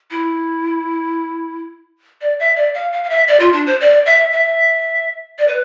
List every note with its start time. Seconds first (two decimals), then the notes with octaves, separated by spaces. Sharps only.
0.11 E4
2.21 D5
2.40 E5
2.56 D5
2.74 F5
2.92 F5
3.04 F5
3.10 E5
3.28 D5
3.40 F4
3.53 D4
3.67 C5
3.81 D5
4.06 E5
4.33 E5
5.39 D5
5.48 B4